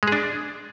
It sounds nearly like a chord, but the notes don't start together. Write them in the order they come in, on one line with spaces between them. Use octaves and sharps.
G#3 G#4 D4